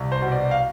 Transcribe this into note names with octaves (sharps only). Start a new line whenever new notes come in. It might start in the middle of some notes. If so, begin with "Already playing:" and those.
Already playing: C2
C5
B2
D5
F5